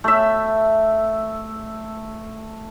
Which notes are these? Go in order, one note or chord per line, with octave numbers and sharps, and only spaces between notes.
A3 E5